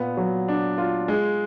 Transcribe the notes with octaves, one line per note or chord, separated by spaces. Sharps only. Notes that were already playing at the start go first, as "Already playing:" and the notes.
Already playing: A#2 B3
F#3
D4
F4
G#3